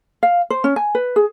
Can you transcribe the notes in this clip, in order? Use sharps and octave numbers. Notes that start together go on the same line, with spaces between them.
F5
C5
C#4
G#5
B4
G#4